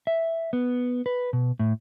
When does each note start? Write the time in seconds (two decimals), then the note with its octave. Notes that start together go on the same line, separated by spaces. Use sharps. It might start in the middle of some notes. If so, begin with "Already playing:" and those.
0.07 E5
0.53 B3
1.06 B4
1.33 B2
1.59 A2